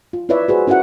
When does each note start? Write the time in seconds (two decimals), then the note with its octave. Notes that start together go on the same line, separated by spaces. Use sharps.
0.13 F4
0.29 E4 F4 B4 C#5 D5 E5
0.48 F#4 G#4 B4 C5
0.67 C#4 E4 F#4 A#4 F#5